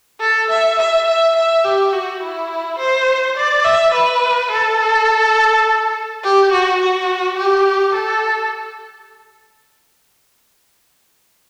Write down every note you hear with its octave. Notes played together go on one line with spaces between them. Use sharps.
A4
E5
E5
E5
E5
G4
F#4
E4
C5
D5
E5
B4
A4
G4
F#4
F#4
G4
A4